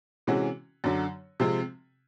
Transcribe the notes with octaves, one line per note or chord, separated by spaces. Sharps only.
C3 E3 G#3 C#4 F#4
F#2 D3 F#3
C3 F3 G#3 C4